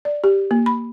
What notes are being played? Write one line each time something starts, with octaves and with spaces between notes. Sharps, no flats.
D5
G4
A#3
B5